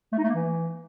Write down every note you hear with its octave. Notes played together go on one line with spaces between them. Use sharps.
A3
D#4
A3
A#3
E3